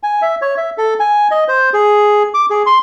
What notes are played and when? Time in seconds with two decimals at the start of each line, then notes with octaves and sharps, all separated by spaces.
0.03 G#5
0.22 E5
0.42 C#5
0.57 E5
0.78 A4
1.00 G#5
1.31 D#5
1.48 C5
1.73 G#4
2.34 D6
2.50 G#4
2.66 C6